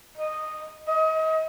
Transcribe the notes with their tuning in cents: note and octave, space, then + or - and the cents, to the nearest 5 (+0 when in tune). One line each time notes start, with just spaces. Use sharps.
D#5 -10
D#5 +30